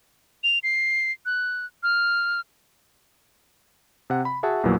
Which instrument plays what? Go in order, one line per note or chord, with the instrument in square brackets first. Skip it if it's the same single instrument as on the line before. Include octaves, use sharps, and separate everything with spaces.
[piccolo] F7
C7
F#6
F6
[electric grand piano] C3 F#5
B5
F#4 G#4 E5 F#5 A5
A#1 E2 A#2 E3 F#3 A#3